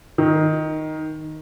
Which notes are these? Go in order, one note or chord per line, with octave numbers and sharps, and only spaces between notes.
D#3